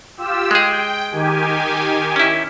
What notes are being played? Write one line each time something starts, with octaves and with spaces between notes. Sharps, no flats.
F4 G4 E6
G#3 G#4 G5
D#3 G4 G#5
C#4 E4